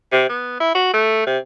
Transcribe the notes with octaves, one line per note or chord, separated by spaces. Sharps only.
C3
B3
E4
F#4
A3
C3